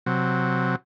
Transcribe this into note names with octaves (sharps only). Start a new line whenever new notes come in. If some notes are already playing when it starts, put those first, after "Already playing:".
C3 F#3